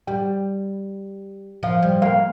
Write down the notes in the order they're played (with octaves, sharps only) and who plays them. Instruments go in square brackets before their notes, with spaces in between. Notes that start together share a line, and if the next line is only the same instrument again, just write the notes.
[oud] G3 [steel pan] G5
[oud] F3 [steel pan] F5
[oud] G3
[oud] A#3 [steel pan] F5